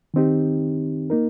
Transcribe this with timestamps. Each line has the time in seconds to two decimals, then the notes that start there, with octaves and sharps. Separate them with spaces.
0.14 D#3 C4 D#4 G4
1.10 A#3 D#4 A#4